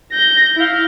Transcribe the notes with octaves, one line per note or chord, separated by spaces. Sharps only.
G6 A#6
E4 F5